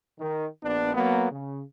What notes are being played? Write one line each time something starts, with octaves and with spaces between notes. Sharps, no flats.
D#3
A#1 B3 D4
F#3 A#3 B3
C#3